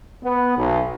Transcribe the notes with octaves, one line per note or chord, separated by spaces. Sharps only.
B3
B1